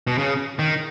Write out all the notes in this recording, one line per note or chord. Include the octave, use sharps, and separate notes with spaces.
B2
C#3
D#3